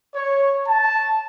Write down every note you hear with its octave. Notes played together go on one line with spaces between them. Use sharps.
C#5
A5